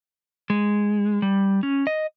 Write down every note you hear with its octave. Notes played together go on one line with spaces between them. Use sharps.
G#3
G3
C#4
D#5